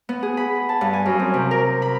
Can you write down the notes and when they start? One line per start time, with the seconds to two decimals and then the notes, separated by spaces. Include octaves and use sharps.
0.09 B3
0.23 G#4
0.37 B5
0.69 A5
0.81 G2
0.93 G#5
1.06 F#2
1.20 C4
1.34 C3
1.51 A#4
1.82 B5